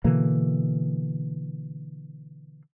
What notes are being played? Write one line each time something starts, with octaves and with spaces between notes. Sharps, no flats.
B2 D3 E3 A#3